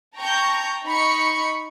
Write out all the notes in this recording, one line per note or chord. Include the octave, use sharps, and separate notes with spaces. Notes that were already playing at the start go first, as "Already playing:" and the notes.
G5 A5 A#5 C#6 G6
D#4 B5 C#6 C#7